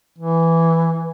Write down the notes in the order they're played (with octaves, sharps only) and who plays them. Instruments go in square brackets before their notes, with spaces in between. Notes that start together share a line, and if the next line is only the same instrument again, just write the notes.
[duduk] E3